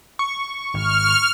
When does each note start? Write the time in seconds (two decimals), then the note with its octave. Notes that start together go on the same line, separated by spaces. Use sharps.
0.19 C#6
0.74 G#1 F6